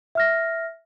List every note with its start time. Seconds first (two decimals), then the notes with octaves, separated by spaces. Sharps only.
0.15 E5 F6 A#6